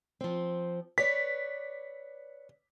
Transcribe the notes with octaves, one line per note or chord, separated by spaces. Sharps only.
F3 C4
B4 C#5 D5 B6